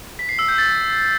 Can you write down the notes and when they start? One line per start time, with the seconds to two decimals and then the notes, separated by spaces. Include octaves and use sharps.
0.19 B6
0.29 C7
0.39 E6
0.48 G6
0.58 A6